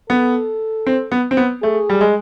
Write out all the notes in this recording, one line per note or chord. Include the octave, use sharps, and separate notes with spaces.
B3 A4
C4
B3
C4
B3
A3 G#4
G3
G#3